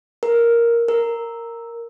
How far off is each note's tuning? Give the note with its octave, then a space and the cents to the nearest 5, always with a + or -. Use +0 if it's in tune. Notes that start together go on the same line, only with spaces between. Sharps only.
A#4 +5
A#4 -5